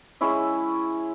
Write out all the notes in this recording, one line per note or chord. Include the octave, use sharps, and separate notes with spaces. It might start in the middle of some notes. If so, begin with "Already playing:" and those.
G#3 C#4 E4 E5